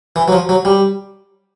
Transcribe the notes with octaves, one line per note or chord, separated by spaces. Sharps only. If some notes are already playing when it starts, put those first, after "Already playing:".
E3
F#3
F3
F#3
G3